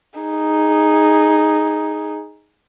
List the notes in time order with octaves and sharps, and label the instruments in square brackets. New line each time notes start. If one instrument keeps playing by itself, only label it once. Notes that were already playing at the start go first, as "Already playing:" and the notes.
[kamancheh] D#4 G#4